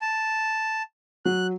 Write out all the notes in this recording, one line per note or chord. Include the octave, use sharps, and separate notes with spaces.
A5
F#3 F#6